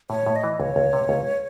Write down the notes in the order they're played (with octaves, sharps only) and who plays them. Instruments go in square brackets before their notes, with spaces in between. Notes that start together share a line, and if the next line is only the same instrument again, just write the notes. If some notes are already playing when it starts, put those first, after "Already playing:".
[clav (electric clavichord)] A2 [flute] C#5
[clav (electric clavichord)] A2
[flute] D#5
[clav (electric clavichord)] E3
[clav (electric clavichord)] C#2 [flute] C#5
[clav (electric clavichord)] C#2
C3
C#2